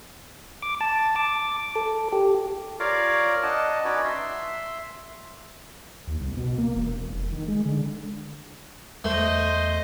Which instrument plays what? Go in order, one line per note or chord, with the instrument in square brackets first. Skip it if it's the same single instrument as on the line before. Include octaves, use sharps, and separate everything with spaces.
[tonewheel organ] D6
A5
D6
A4
G4
[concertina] F4 A#4 C#5 D5 F5
D4 D#5 F#5 A5
C#4 D#4 F#4 B4 C#5 D5
E5 C6
[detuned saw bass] D#2
C2
B2
A#3
E1
F1
D#3
G#3
D3
[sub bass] E2 [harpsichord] A3 [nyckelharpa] C5 D#5